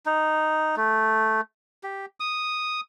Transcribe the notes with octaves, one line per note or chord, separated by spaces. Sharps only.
D#4
A3
G4
D#6